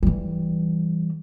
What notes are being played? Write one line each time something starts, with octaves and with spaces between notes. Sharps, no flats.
E3 G3